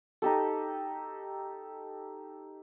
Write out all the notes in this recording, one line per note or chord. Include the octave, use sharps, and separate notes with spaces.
D#4 G4 A4